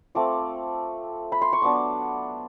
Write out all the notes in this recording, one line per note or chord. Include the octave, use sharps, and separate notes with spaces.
A3 C4 F4 D6
B5
C6
C#6
F#3 B3 D4 D6